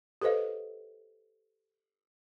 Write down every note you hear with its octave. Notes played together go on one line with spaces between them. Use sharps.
G4 A4 B4 C5 D#5 F5